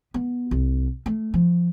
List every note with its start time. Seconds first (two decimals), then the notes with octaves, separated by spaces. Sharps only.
0.14 B3
0.51 C2
1.06 A3
1.34 F3